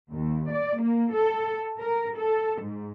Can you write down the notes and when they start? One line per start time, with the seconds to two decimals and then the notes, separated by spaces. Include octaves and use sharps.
0.12 D#2
0.51 D5
0.82 A#3
1.14 A4
1.80 A#4
2.19 A4
2.61 G#2